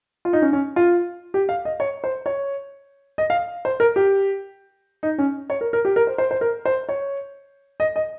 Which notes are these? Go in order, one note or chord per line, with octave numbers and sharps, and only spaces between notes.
F4
D#4
C#4
C#4
F4
G4
F5
D#5
C#5
C5
C#5
D#5
F5
C5
A#4
G4
D#4
C#4
C#5
A#4
A#4
G4
A#4
C5
C5
C5
A#4
C5
C#5
D#5
D#5